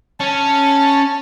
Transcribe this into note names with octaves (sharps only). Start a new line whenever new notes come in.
C#4 A5